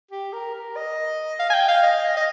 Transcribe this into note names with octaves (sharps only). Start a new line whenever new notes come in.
G4
A#4
A#4
D#5
F5
G#5
G5
F5
D#5
D#5